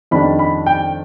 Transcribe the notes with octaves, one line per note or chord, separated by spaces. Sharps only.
F2 D#3 G3 D4 B5
B5
G5